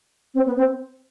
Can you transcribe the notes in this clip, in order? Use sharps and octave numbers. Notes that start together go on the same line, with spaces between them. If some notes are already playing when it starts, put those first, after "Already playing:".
C4
B3
C4